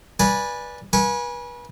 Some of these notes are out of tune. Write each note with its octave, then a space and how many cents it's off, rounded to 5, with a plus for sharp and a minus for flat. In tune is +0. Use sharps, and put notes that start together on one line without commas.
B4 -20 D5 +0 G#5 +0
B4 -35 G#5 +0 C#6 -5